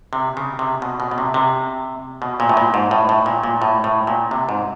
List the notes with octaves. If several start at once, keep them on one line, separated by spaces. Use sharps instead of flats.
C3
C#3
C3
B2
B2
B2
C3
C3
B2
A#2
A2
A#2
G#2
A2
A2
A#2
A#2
A2
A2
A#2
C3
G#2